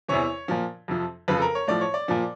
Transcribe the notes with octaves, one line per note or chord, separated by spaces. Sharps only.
E2 C3 E3 C#5
A#2 F3
F2 C3 F3
F2 C#3 F3 B4
A4
A#4
C#5
A2 F3 D5
C#5
D5
A#2 F3